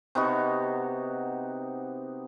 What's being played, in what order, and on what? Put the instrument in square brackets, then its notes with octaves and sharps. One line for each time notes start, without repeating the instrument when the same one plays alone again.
[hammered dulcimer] C3 B3 D#4 F#4